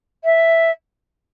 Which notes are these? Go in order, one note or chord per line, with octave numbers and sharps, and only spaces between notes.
E5